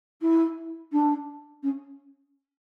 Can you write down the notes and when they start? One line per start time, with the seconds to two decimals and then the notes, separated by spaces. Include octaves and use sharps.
0.21 E4
0.92 D4
1.62 C#4